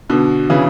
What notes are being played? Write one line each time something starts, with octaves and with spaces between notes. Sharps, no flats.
B2 D3
C#3 E3